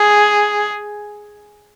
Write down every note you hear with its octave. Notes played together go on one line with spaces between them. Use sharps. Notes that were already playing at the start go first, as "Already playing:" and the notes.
Already playing: G#4